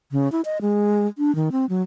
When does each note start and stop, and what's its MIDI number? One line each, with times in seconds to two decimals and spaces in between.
0.12 0.31 49
0.32 0.41 64
0.45 0.58 75
0.62 1.07 56
1.18 1.34 62
1.35 1.49 51
1.52 1.66 60
1.69 1.82 54